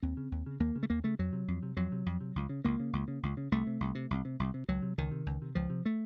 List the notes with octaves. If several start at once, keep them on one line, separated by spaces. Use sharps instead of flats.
D#2 C4
C#3
D#2
C#3
D#2 A#3
C#3
A3
D#2 A#3
C#3 A3
F2 F#3
C3
F2
C3
F2 F#3
C3
F2
C3
C#2
C#3
C#2 A#3
C#3
C#2
C#3
C#2
C#3
C2 A3
C3
C2
C3
C2
C3
C2
C3
C#2 F#3
C3
C#2 D#3
C3
C#2
C3
C#2 F3
C3
A3